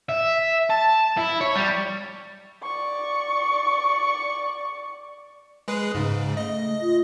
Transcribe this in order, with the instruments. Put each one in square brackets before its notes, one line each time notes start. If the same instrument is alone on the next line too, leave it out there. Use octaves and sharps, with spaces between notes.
[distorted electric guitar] E5
A5
E4
C#5
G3
[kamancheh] D5 C#6
[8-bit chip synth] G#3 G#4 B4
G#2 C#3
[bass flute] A3 [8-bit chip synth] D#5
[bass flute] F4